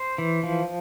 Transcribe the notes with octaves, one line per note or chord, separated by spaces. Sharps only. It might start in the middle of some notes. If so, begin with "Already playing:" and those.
Already playing: C5
E3
F3